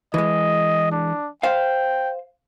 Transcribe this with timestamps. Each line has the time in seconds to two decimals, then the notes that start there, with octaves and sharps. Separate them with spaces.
0.14 E3 G#3 D#5
0.92 D4
1.43 C5 F5 G5